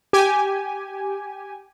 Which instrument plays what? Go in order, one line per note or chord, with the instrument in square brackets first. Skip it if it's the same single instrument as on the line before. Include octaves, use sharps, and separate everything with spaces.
[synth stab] G4 G#5